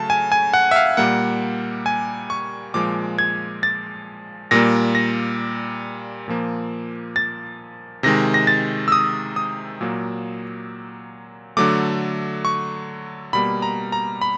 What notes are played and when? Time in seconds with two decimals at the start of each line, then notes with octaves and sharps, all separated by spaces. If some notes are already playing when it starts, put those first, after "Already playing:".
Already playing: C#3 F#3 A3 A5
0.10 G#5
0.32 G#5
0.54 F#5
0.71 E5
0.76 F5
0.97 A#2 G3 A#3 F#5
1.86 G#5
2.30 C#6
2.74 A#2 F3 G#3 D6
3.19 G#6
3.63 A6
4.51 A#2 G3 A#3 A#6
4.95 A#6
6.28 A#2 F3 A#3
7.16 A6
8.03 C3 D#3 G#3 A#6
8.34 A#6
8.47 A6
8.88 E6
8.92 D#6
9.36 D#6
9.81 A#2 F#3 A#3
11.57 D3 F#3 A3 D6
12.45 C#6
13.33 B2 G3 A#3 B5
13.62 A#5
13.92 A#5
14.21 B5